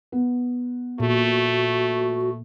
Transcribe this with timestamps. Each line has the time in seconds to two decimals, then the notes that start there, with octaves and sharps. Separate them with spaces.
0.12 B3
1.00 A#2 A3 F#4